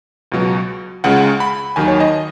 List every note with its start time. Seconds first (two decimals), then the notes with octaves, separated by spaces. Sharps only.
0.32 C#2 B2 F#3
1.04 C#2 C#3 G#3 F#5
1.40 B5
1.76 D#2 D#3 F#3 G#5
1.88 C#5
2.00 D#5